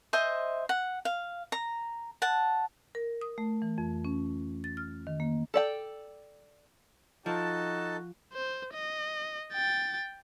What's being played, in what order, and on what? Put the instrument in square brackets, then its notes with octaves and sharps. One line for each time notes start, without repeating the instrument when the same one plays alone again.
[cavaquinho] C5 D#5 E5 G#5
F#5
F5
A#5
F#5 A5
[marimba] A#4
D#6
A3
E3
F2
C#4
A6
F6
D#3
A#3
[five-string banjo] A4 D5 G5
[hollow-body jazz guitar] F3 [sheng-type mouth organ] D#4 A4 A5 [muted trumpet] F#4
[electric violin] C5
D#5
G5 A6